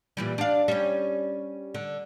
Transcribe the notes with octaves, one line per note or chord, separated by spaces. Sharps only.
A#2 E3 G3
D4 F5
G3 C#4
D3